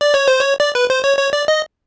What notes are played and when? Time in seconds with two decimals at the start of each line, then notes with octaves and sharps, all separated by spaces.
0.01 D5
0.14 C#5
0.28 C5
0.40 C#5
0.60 D5
0.75 B4
0.90 C5
1.04 C#5
1.18 C#5
1.33 D5
1.48 D#5